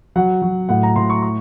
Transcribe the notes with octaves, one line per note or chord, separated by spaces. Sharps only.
F#3 F#5
F#3
A2 F#5
A#5
A2 C6
C#6
C#6